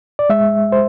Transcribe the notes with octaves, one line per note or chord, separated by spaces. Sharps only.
D5
G#3 E5
C5